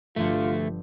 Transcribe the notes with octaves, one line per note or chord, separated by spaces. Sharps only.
G1 D3 F3 A3 F4 G4